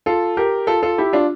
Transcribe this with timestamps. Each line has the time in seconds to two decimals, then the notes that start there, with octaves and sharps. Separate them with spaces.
0.06 F4 A4
0.37 G4 A#4
0.67 F4 A4
0.82 F4 A4
0.98 E4 G4
1.13 D4 F4